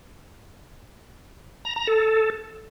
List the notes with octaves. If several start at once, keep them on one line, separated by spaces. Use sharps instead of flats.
A#5
A#5
A4